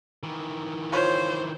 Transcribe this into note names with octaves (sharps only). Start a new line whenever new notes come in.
D#3 E3
F4 C5 C#5